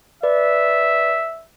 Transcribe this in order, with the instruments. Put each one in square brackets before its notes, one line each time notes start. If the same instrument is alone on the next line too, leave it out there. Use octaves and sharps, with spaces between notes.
[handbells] B4 D5 [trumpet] E5